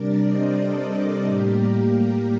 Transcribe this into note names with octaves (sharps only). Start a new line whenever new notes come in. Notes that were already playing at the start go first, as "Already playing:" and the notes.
Already playing: C3 G3 D4 A#4 D5
C5 D#5
A4
A4
A2 G3 A#3 G4 A#4